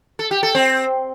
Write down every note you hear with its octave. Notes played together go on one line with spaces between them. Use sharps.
A4
G4
A4
C4